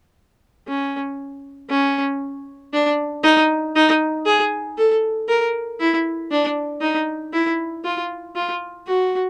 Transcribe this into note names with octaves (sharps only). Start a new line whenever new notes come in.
C#4
C#4
D4
D#4
D#4
G#4
A4
A#4
E4
D4
D#4
E4
F4
F4
F#4